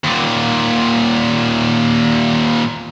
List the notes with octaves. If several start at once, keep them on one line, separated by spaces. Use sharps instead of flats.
D#2 A#2